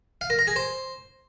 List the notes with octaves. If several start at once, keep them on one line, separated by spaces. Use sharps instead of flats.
F5
A#4
A#5
G#4
C5